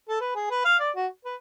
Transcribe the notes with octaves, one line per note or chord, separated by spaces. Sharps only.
A4
B4
G#4
B4
F5
D5
F#4
B4